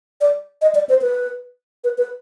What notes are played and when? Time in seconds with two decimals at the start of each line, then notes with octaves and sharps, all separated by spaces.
0.21 D5
0.62 D#5
0.75 D5
0.89 C5
1.02 B4
1.84 B4
1.98 B4